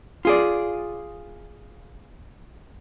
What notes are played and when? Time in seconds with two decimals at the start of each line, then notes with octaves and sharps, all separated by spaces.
0.25 F4 G#4 D5